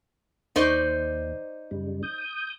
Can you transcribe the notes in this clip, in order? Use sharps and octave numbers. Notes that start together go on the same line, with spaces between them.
D#2 D#4 C5 D5
F#2 C#3 G3
D#6 G6